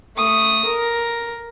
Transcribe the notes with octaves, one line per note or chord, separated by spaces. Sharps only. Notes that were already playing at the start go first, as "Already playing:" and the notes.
A3 D#6
A#4